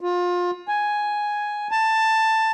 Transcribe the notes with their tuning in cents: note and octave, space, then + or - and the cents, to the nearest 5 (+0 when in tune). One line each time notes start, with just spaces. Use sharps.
F4 +25
G#5 +5
A5 +10